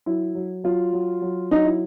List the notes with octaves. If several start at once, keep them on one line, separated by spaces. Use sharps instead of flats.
F#3 E4
F#3
F#3 F4
F#3
F#3
F#3 D#4
E4